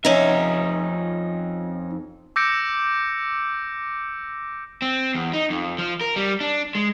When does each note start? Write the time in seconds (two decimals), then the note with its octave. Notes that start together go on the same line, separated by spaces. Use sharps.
0.05 F2 C#4 D#4 E5
2.36 D6 E6 G6 A#6 C#7 D7
4.82 C4
5.14 E2
5.33 D#4
5.50 F2
5.78 F3
6.01 A#4
6.16 G3
6.41 D4
6.75 G#3